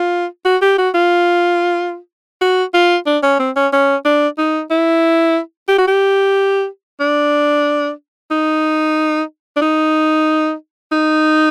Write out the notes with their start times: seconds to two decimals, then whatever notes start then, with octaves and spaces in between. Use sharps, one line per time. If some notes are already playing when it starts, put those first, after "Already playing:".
Already playing: F4
0.45 F#4
0.62 G4
0.78 F#4
0.95 F4
2.41 F#4
2.74 F4
3.07 D4
3.23 C#4
3.39 C4
3.56 C#4
3.73 C#4
4.05 D4
4.38 D#4
4.71 E4
5.68 G4
5.78 F#4
5.88 G4
7.00 D4
8.31 D#4
9.56 D4
9.61 D#4
10.92 D#4